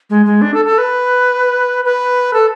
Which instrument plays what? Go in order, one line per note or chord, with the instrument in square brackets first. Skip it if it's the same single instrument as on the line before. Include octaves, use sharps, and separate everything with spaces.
[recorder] G#3
G#3
D4
A4
A4
B4
B4
A4